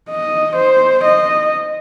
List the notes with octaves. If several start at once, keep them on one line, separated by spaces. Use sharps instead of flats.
D#5
C5
D#5